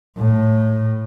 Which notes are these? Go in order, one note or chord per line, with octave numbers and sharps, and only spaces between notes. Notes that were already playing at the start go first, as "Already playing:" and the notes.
A2